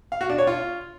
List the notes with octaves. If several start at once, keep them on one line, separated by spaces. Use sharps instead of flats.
F5
F#4
D4
C#5
F4